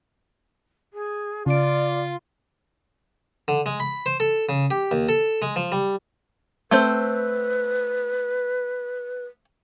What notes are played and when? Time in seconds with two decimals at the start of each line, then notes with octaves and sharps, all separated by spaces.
0.93 G#4
1.46 C#3 F4 D5 D7
3.48 D3
3.66 G#3
3.80 B5
4.06 C5
4.20 A4
4.49 C#3
4.71 G4
4.91 D#2
5.09 A4
5.42 G#3
5.56 F3
5.72 G3
6.71 A3 C4 B4 C5